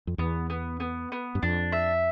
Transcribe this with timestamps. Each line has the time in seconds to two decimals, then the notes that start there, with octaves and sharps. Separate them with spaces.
0.07 F2
0.18 E2 B3
0.50 B3
0.80 B3
1.12 B3
1.35 G2
1.43 F2 D4
1.72 E5